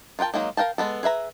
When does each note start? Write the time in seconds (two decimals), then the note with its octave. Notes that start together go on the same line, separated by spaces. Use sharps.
0.19 F4 A#4 F#5 G5 A5
0.34 F#3 G#3 A#3 D#4
0.57 A#4 F5 G5 A5
0.78 G#3 B3 A4
1.03 G#4 B4 E5 A#5